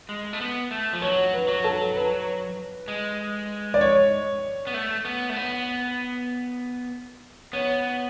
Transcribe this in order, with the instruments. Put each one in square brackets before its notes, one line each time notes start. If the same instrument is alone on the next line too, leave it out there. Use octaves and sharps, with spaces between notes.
[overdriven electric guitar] G#3
A3
B3
A3
F3
[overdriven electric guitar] F#3 [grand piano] C#5
[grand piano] B4
[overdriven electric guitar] F#3
[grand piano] A4
B4
[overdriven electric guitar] G#3
[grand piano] D5
C#5
[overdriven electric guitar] B3
A3
B3
A3
B3
[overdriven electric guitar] B3 [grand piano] C#5